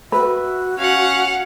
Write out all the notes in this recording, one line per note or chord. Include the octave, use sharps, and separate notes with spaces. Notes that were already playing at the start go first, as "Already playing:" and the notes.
F#4 B4 E5
C#4 F5 F#5